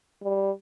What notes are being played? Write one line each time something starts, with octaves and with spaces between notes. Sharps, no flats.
G3